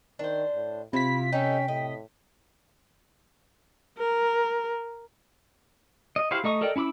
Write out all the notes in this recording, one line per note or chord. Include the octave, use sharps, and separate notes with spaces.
D#3 D4 C5
A2
C3 E4 F4 G4 B5 B6
C#4 D#4 A4 G5
A2 D#5
A#4
D#5
E4 F#4 G4 C5 F5
A3 D#4 D#5 C#6 D#6
A4 A#4 D5 D#5 G5
C#4 E4 B5 D6 E6